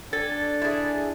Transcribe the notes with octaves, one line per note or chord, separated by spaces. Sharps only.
D4 A4 G#5 A6
E4 G#4